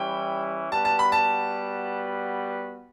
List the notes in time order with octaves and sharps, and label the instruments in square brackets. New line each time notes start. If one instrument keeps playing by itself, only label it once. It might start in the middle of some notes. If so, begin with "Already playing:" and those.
Already playing: [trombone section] E3 G3 C#4 E4 [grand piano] G5
[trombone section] G3 B3 F#4 B4 [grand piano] A5
[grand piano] A5
B5
A5